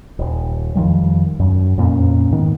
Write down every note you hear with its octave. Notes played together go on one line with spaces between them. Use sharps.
D#1
F2 D#3 F3 G3
F#2
F2 A#2 A#3 C#4
G#2 D#3 B3